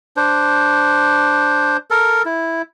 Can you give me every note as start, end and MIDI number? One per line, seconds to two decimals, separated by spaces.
0.17 1.77 62
0.17 1.77 72
1.90 2.22 69
1.90 2.22 70
2.25 2.62 64